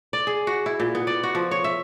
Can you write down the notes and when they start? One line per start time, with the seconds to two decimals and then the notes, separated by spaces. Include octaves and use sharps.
0.13 D5
0.27 G#4
0.47 F#4
0.66 E4
0.80 A#2
0.95 B3
1.07 D5
1.23 F#4
1.35 F3
1.51 C#5
1.64 E5